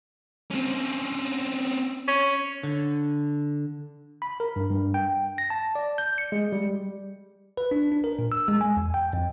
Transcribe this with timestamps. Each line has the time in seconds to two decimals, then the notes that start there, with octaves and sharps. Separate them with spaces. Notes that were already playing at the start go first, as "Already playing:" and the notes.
0.50 C4 C#4
2.08 C#4
2.63 D3
4.22 B5
4.40 A#4
4.56 G2
4.70 G2
4.94 G5
5.38 A#6
5.50 A5
5.75 D5
5.98 G6
6.18 C#7
6.32 G#3
6.52 G3
7.57 B4
7.71 D4
7.92 D4
8.04 A#4
8.19 A#2
8.32 E6
8.48 G#3
8.61 G#5
8.77 E2
8.94 G5
9.13 F2